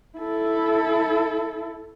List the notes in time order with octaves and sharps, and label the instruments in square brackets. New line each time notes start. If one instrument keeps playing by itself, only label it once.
[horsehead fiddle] E4 A4